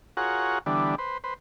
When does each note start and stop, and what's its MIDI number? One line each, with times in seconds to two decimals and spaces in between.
0.17 0.59 65
0.17 0.59 66
0.17 0.59 68
0.17 0.59 70
0.17 0.59 73
0.17 0.59 78
0.66 0.95 50
0.66 0.95 52
0.66 0.95 55
0.66 0.95 59
0.66 0.95 62
0.98 1.18 71
0.98 1.18 72
1.24 1.34 71
1.24 1.34 72